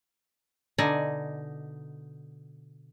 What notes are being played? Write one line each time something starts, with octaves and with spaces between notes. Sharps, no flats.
B2 D3 D#4 D5 G#5